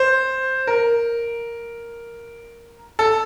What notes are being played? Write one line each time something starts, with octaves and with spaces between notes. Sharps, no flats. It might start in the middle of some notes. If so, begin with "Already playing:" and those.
Already playing: C5
A#4
A4